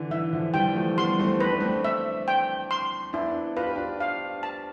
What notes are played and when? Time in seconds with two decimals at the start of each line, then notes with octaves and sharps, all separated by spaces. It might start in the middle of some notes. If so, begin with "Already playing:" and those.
Already playing: D3 E3
0.11 E3 E5
0.33 D3 F3
0.54 E3 G3 G5
0.76 F3 A3
0.98 G3 B3 C6
1.19 A3 C4
1.40 C4 B4
1.51 D4
1.60 A3 C4
1.84 E5
2.28 G5
2.71 C6
3.13 B3 D4 E4
3.57 F4 B4
3.67 G4
3.76 D4 F4
4.01 F5
4.43 A5